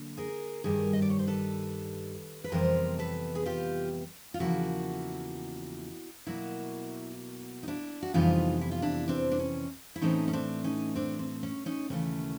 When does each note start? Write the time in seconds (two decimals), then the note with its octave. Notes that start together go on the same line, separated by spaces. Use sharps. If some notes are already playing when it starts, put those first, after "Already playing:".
Already playing: D3 F#3 A#3
0.17 G#4 A#4
0.64 G2 D#3 G3 G#4 A#4
0.93 D#5
1.02 D5
1.10 C#5
1.19 C5
1.27 A4 B4
2.44 B4
2.52 F2 C3 E3 G3 B3 A#4 C5
2.99 A4 B4
3.35 G#4
3.46 F4 G4
4.34 F4
4.39 E2 C#3 F3 A#3 E4 F#4
6.27 B2 F#3 A#3 E4 F#4
7.63 D#4
7.68 D4 E4
8.03 F#4
8.14 F2 C3 E3 G3 B3 D#4 F4
8.61 E4
8.71 F4
8.82 D4 E4
9.08 C4 D4
9.31 D4
9.39 C#4
9.96 E4
10.01 A2 E3 A3 C4 C#4 D#4
10.28 C#4
10.33 C4 D4
10.64 C#4 D#4
10.95 C4 D4
11.19 C4
11.43 C#4
11.66 C#4 D#4
11.89 D#2 C#3 E3 A3 C#4